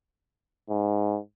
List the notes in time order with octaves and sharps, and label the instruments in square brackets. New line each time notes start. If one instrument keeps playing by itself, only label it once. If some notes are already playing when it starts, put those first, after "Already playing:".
[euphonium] G#2